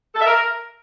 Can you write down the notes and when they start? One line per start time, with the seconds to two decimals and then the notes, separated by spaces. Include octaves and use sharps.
0.15 A4
0.21 E5
0.26 A#4